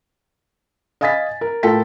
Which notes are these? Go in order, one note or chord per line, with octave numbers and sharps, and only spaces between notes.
D#5 F5 G#5 D#6 A6 B6
A#4
A2 F4 A4 A#4 G5 B6